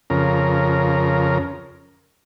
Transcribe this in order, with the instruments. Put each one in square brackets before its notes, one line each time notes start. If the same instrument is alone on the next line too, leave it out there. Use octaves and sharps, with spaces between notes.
[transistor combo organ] F2 C#3 A#4